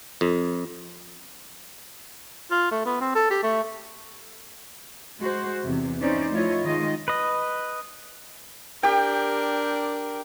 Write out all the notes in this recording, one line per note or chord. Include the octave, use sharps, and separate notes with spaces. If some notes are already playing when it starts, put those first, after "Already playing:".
F2
F4
A3
B3
C4
A4
G4
A3
G#3 F#4 C5
E2 C3
E3 C#4 D#4 C5 D5
F3 A3 E4 F4 C#5 D#5
D#3 G#3 F4 D#5
B4 D#5
D4 G4 A#4 G5